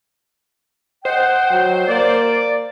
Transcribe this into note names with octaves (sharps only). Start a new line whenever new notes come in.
C5 D#5 F#5 G5
F#3
A#3 D5